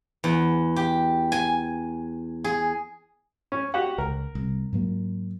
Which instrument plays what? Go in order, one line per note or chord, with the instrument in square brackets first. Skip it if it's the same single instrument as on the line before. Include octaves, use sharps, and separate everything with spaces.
[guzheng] E2
G4
G#5
G#4
[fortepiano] C#4
F#4 G4 F#5
[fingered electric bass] C#2 [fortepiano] A#4
[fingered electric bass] C2
G#2 F#3 A#3